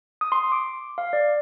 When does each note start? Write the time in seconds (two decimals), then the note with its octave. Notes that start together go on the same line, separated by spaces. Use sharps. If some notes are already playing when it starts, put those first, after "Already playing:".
0.21 D#6
0.32 C6
0.52 D6
0.98 F5
1.13 D5